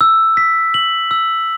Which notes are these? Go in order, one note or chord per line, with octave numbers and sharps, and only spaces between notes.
E6
B6
F#7
E6